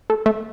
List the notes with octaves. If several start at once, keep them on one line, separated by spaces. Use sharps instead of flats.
A3
A3